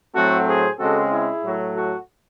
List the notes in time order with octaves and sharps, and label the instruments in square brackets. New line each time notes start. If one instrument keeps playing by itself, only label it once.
[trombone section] A2 F#3 A3 C4 F#4 A4
G#4 C5
C#3 G#3 C4 F#4 A4
E4 G#4
A2 F#3 A3
F#4 A4